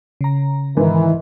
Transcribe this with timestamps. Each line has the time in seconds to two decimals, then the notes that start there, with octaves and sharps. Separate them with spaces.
0.21 C#3 A#5
0.77 G#2 D#3 E3